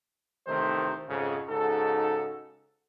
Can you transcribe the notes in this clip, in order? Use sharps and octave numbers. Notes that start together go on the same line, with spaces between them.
A1 C3 D#3 A3 D#4 C5
F2 G#2 C#3
G#2 C#3 D#4 F#4 A4